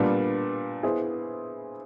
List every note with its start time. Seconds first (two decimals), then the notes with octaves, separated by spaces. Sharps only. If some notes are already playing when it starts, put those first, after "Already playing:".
Already playing: A#2 G3 B3 D4
0.83 B3 E4 G#4 C5